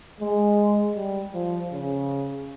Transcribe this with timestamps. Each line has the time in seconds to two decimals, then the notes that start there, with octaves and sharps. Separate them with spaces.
0.20 G#3
0.95 G3
1.34 F3
1.72 C#3